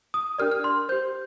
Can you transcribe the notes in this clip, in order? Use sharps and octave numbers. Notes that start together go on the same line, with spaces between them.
D#6
D4 G4 A#4 D5 F6
F6
C6
G4 C5 G6